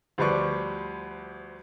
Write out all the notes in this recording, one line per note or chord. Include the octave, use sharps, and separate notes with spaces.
D2 F3 G3 B4 D5 C#6